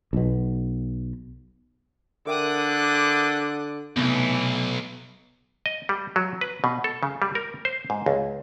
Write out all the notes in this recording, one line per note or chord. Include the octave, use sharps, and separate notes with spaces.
B1 B2
D3 A#4 E5 G5 D6 D#6 F#6
B1 C3 E3 A3 B3
D#5
G3
F#3
B4
B2
A4
C#3
G3
A#4
C5
G#2
C#2